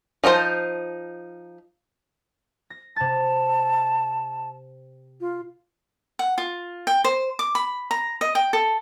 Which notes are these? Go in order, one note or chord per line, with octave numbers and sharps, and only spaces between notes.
F3 D#4 F#4 C5 A5
A#6
C3 A5 A6
F4
F#5
F4
G5
C5
D6
B5
A#5
D#5
G5
A4